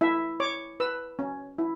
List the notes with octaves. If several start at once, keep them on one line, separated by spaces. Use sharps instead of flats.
E4 E5
C#5 D6
B4 E6
C#4
E4